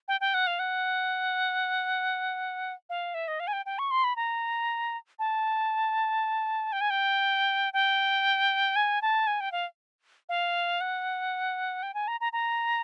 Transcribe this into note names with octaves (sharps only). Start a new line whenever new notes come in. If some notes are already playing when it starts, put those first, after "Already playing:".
G5
G5
F#5
F5
F#5
F5
E5
D#5
F5
G#5
G5
G5
C#6
C6
B5
A#5
A5
G5
G#5
G5
G5
G#5
A5
G#5
G5
F5
F5
F#5
G5
G#5
A#5
A#5
A#5